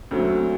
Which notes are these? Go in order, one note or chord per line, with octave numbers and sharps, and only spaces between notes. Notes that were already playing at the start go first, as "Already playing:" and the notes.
D2 D3 F#3 A3 C4